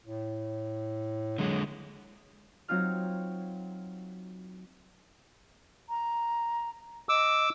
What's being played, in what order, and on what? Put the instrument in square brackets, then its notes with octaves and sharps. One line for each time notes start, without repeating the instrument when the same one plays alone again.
[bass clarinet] A2
[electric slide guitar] D3 G#3 [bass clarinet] F#3
[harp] F#3 C4 D#4 F4 F6
[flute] A#5
[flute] D#5 [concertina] D6 E6